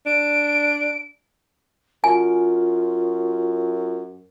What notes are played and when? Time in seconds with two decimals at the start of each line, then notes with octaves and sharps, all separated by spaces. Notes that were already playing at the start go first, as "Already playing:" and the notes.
0.06 D4 D7
2.04 F#2 F4 G#5